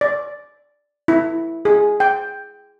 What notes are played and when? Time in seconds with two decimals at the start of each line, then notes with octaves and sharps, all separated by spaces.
0.01 D5
1.08 E4
1.65 G#4
2.00 G5